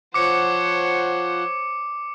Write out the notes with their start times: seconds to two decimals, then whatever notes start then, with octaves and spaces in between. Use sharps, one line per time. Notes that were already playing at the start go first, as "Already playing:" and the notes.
0.14 F3 C5 C#5 F#5 D6 C#7